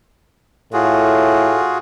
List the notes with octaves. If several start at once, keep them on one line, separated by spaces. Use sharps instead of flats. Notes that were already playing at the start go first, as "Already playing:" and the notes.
A2 F4 F#4 G#4